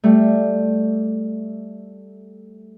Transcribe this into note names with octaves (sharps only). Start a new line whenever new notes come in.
G3 A3